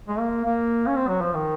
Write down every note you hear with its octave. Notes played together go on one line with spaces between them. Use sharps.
G#3
A#3
A#3
C#4
C4
F#3
F3
D#3